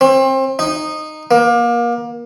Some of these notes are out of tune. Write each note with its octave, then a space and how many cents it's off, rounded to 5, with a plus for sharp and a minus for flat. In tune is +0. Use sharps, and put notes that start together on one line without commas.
C4 +30
D#4 -10
A#3 +30